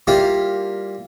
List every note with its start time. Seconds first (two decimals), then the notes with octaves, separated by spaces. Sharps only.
0.07 G3 A#3 E4 F4